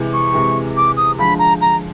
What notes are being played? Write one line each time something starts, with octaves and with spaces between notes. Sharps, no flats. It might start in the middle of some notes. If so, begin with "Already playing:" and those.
Already playing: C3 E3 G#3
C#6
C3 E3 G#3
D6
D#6
D3 F3 G#3 B5
A#5
A#5